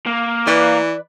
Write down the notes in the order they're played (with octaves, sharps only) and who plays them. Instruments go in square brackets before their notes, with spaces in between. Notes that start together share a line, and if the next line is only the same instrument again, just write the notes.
[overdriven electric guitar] A#3
[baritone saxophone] E3 [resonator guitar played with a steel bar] B4 D5